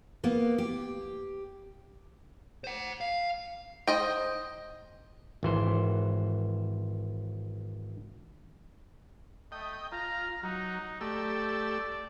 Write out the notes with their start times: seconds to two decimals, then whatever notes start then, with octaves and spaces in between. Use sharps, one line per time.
0.23 A#3 B3
0.58 G4
2.64 C5 F#5
3.01 F5
3.87 C5 D#5 G5
5.43 G#1 E3 C5
9.52 A3 D#5 G5
9.92 F4 A#5
10.43 F#3 D#4
11.01 A3 G4 D5 E6